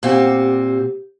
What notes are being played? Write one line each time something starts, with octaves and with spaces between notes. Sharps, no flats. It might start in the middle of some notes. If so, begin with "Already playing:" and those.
A#2 C4 F#4 G4